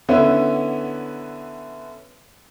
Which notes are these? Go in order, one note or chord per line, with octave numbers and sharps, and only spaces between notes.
D3 B3 C#4 E4